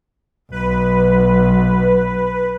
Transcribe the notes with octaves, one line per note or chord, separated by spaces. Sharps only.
B1 B4